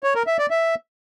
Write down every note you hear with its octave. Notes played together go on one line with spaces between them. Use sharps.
C#5
A#4
E5
D5
E5